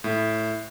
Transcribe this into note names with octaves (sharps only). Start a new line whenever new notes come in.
A2